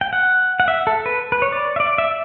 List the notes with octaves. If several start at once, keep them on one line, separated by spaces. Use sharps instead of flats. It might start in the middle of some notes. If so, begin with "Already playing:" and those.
G5
F#5
F#5
E5
A4
B4
B4
C#5
D5
E5
D5
E5